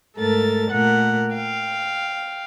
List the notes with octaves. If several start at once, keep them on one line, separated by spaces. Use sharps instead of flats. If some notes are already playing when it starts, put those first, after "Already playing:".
G#2 A3 A4 A#4 A6
A#2 A3 A#4 F#5
F5 G5